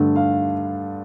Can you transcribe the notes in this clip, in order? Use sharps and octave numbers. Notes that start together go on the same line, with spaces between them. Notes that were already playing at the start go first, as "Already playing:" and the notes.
Already playing: G2 D3 A3
F5